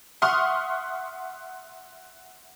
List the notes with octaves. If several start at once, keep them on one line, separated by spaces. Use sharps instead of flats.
E5 F#5 C6 C#6 D#6 F6